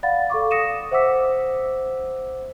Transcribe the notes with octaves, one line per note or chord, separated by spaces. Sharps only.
D5 F5 F#5 B5 A6
A4 F5 C#6 D6
D#6 A#6 C#7 D#7 E7
C5 E5 F#5 D6 E6 B6